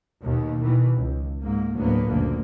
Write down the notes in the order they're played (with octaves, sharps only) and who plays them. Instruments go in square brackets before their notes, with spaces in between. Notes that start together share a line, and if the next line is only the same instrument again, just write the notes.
[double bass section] D#2 B2 D#3
B2 D#3 E3
C#2
G#2 A#3
D2 A2 F#3 A#3 B3
F#1 D2 A#2 A#3